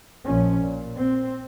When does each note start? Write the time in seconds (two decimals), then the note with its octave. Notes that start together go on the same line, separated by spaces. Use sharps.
0.24 A#1 F3 C#4
0.60 A#2
0.97 C4